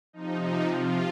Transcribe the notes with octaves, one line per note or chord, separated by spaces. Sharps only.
C3 F3 D#4
D#4
F4